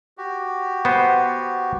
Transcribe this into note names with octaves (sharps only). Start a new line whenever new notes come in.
F#4 G4
B3 C5